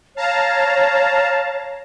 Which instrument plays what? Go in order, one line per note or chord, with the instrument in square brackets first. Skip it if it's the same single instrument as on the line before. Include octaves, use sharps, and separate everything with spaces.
[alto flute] C#5 [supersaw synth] F5 A5 A#5